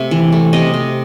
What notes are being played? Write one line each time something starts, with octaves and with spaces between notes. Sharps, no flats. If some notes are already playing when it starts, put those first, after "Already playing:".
Already playing: C3 A3 E5
E3
A3
C3 D#5
C3